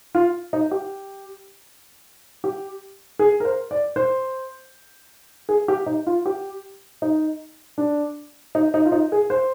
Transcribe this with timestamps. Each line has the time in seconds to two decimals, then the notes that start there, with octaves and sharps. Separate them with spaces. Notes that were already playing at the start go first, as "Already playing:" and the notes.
0.15 F4
0.53 D#4
0.71 G4
2.44 G4
3.19 G#4
3.40 A#4
3.45 C5
3.71 D5
3.96 C5
5.49 G#4
5.68 G4
5.86 D#4
6.07 F4
6.26 G4
7.02 D#4
7.78 D4
8.55 D#4
8.74 D#4
8.86 F4
8.92 D#4
9.12 G#4
9.30 C5